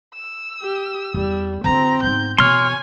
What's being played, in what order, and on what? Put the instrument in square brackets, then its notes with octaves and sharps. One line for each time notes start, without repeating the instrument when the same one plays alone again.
[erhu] E6
[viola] G4
[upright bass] E2 [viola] G3
[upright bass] D3 F4 [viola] C4 [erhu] A#5
[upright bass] G#2 B3 [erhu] G6
[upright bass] B2 E3 [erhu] C#5 [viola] G#5 [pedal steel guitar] C6 F6